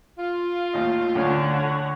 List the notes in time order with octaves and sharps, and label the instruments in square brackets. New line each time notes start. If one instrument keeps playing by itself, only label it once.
[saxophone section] F4
[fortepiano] D#2 A2 D#5
[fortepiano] D2 A2 C#4 [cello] D3 [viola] C#5 F#5